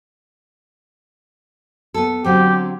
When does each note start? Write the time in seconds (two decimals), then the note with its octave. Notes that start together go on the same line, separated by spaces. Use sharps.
1.94 B3 A4
2.24 D3 F#3 C4 G4